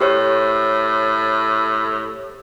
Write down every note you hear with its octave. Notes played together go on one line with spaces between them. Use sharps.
A2 G4 C5 C#5